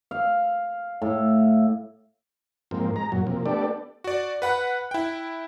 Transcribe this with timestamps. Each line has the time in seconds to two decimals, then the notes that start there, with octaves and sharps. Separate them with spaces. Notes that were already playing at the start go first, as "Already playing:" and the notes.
0.11 F5
1.02 A2
2.71 G#2 F3 A#3 C4
2.96 G#3 A#5
3.12 F#2 A#2 F#3
3.27 C3 F3 A#3
3.46 A3 B3 D4 G4 A4 D5
4.04 F#4 D5
4.42 B4 F#5 B5 F#6
4.91 E4 G5